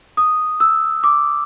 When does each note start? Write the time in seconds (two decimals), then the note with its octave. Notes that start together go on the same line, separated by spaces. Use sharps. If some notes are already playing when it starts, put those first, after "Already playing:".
0.17 D#6
0.60 E6
1.04 D6